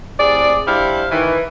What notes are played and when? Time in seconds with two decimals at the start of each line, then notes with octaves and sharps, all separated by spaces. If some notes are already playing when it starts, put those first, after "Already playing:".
0.19 A2 C3 G#4 D5
0.67 G3 D4 E4 C5 F5
1.11 D#3 E3